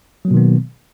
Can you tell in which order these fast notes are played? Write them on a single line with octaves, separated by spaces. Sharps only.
F#3 A#3 B2 D#3 B3